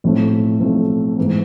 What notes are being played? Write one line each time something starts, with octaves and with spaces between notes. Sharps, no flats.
B1 A2 F3 A3 C4
B1 A2 F3 A3 C4
G#2 E3 B3